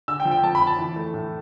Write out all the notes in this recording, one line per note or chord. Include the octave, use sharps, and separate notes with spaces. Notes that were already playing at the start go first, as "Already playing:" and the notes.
D3 E6
G5
F3
G5
F2 A5
B5
F2
A5
E3
A3
A2